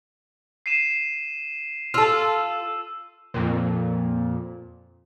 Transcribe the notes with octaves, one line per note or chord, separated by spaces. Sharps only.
C7 D#7 E7
F4 A4 E6
F2 A#2